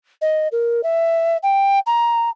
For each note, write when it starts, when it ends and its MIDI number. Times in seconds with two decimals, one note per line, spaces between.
0.21 0.48 75
0.52 0.81 70
0.83 1.37 76
1.43 1.79 79
1.86 2.29 82